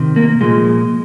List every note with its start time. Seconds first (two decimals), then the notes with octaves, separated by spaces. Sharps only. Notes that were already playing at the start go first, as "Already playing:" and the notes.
Already playing: C3 D#3
0.16 A#3
0.41 A#2 F3 G#3